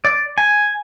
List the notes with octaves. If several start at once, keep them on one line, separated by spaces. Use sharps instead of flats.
D5
G#5